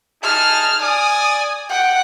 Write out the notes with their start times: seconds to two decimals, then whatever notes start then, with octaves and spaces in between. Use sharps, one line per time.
0.23 D#4 G#4 A5 F6
0.82 D5 G#5 D#6
1.69 F#5 G5